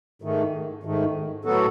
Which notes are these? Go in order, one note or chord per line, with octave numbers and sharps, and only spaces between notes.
G#2 D#3 A3
G#2 D#3 A3
A2 F#3 B3 F#4 A4